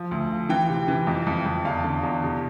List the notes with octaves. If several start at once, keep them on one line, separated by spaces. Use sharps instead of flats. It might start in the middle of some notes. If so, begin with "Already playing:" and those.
Already playing: F3
D2
F3
E3 G5
C3
E3
F2
F2
F2
E2 F5
D3
E2
C3